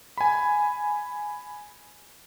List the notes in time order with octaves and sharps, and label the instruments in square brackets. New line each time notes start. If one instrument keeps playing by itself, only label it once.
[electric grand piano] G#5 B5